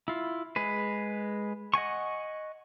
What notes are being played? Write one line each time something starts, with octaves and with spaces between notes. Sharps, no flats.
E4 F4
G#3 G#4 B4
D#5 F#5 G#5 C#6